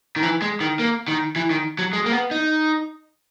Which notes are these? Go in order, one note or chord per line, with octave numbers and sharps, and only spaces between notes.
D#3
E3
G#3
D#3
A#3
D#3
E3
D#3
F#3
G#3
A#3
B3
D#4